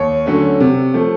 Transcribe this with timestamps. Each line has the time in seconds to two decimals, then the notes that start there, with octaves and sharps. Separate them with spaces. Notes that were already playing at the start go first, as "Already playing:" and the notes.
Already playing: D#2 C#5
0.26 D3 F#3 A3 C#4
0.60 C3
0.94 F3 A3